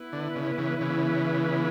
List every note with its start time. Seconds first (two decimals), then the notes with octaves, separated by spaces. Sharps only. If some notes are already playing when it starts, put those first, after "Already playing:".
Already playing: B3 E4 B4
0.12 D3
0.36 C#3
0.58 C#3 E3
0.81 C#3 E3